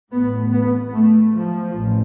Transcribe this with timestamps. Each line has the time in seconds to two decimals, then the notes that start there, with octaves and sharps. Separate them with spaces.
0.11 A1 A2 B3
0.52 B3
0.93 A3
1.33 F3
1.74 A1